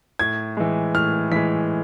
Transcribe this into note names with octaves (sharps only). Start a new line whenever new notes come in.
A2 G#6
E3 G#3
A2 F6
E3 G#3 B6